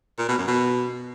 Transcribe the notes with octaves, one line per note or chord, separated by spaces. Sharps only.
A#2
B2
F#2
B2